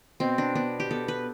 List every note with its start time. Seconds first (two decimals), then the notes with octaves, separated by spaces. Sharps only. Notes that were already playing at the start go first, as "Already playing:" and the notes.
0.20 B2 C4
0.38 D4
0.55 B3 D4
0.80 G4
0.91 B3 A4
1.08 B4